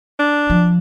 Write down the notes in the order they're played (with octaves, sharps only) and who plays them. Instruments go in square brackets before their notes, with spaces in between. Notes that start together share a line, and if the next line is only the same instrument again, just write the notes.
[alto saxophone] D4
[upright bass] F3